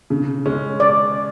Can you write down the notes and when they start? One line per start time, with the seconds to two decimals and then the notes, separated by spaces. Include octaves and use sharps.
0.10 C#3
0.46 G#3 C#4
0.80 D5